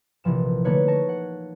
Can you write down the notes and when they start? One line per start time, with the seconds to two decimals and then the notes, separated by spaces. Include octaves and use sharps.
0.24 A#1 C3 E3 F3 E7
0.65 D3 A3 A#3 D#4 B4 C#5
0.88 A5 C#6 A#6
1.09 F#5